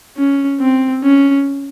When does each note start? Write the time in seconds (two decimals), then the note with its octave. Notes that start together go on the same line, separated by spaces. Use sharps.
0.17 C#4
0.61 C4
1.04 C#4